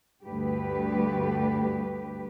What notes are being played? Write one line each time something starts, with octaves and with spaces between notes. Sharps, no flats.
D2 G2 G4 B4